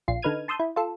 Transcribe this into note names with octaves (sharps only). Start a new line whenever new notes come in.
A#1 F4 C7
D3 D#4 B4 F6 G#6 D#7
A5 C6 D#6 E6 G6
E4
F4 A4